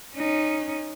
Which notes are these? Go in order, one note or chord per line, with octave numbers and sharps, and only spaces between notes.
C#4 D#4